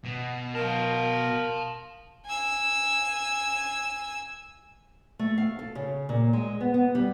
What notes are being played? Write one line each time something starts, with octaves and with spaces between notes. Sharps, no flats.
B2
A#4 F5 A5
G#5 E6
A3
F5
A4
C#3
A#2
G#3
B3
B3
G3